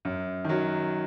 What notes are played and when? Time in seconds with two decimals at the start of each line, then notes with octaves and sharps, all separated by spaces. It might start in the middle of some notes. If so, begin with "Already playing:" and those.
0.05 F#2
0.45 D#3 F#3